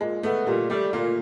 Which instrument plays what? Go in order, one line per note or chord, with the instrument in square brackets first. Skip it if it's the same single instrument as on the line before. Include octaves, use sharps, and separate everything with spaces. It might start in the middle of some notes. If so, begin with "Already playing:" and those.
[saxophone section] A#2 [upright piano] G#3
[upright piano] A3 [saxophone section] B3
[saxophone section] A#2 [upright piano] G3
[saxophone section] G3 [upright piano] A3
[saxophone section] A#2 [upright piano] A#3